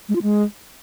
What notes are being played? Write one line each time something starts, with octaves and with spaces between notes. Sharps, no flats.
G#3
F4
G#3